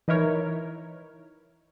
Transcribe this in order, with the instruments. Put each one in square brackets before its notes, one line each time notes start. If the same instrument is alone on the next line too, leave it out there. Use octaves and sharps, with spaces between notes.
[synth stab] E3 D#4 E4 A#4 C#5